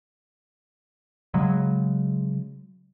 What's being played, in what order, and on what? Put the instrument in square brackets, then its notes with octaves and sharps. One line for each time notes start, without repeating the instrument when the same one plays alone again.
[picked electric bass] C#3 F#3 G#3